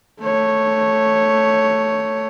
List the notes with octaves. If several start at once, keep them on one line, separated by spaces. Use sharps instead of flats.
A3 C#5